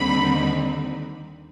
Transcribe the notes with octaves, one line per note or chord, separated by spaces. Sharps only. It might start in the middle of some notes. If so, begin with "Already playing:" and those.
Already playing: D#2 D3 G3 C4 D#4 B5